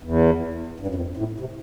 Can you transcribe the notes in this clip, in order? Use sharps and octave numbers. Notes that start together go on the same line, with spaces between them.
E2
G2
F#2
F2
A2
C3